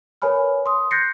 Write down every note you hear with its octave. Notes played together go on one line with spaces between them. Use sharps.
A#4 B4 C#5 G#5 B5 F6
C6 D#6
F#6 G6 A6 A#6 C7 C#7